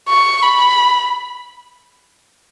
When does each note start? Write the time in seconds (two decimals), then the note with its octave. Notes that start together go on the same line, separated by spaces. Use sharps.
0.09 C#6
0.42 B5